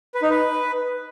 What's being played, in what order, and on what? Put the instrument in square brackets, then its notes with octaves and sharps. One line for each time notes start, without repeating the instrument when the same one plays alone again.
[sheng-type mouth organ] B4
D#4
B4